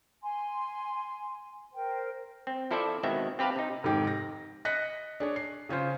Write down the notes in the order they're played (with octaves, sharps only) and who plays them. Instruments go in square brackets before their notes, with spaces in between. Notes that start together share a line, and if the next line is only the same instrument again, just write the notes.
[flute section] G#5 C6
A#4 C5 G5
[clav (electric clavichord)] C4
F3 E4 A4 C5 D5 E5
B2 D#3 G#3 B3 C4 E5
C4 G4 B4 F5 A5
C3 D#4
[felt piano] F1 G#2 D#3 G4 G5
A#6
D#5 F#6 A#6 B6 C#7
D4 G#4 C#5
C7
C#3 C#4 F4 C5